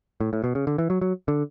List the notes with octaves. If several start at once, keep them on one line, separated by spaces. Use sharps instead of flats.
A2
A2
B2
C#3
D3
E3
F#3
F#3
D3